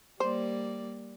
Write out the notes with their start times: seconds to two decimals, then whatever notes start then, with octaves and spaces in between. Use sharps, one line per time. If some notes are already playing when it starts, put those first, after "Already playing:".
0.20 G3 A#3 C5 D5